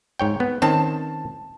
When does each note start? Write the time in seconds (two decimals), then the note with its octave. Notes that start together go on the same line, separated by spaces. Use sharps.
0.19 G#2 C#5 G5
0.40 B3
0.62 D#3 C4 C#4 A5